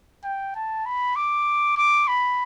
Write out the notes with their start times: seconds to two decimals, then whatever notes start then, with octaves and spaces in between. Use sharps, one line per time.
0.24 G5
0.56 A5
0.86 B5
1.16 D6
1.77 D6
2.08 B5